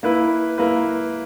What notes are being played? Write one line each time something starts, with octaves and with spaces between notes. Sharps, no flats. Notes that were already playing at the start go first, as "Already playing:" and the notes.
A#3 E4 B4
A#3 E4 B4